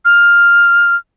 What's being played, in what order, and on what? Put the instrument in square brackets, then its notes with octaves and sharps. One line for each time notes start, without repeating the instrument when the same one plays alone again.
[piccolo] F6